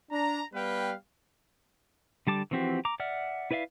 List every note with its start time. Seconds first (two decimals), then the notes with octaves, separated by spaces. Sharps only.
0.12 D4 A#5
0.54 G3 B3 B4 F5 G5
2.27 D3 G3 A5 D6
2.51 E3 F3 C4 F#4 G4
2.85 A#5 D6
3.00 D5 E5 F#5 F6
3.51 E4 B4 D5 E5 F5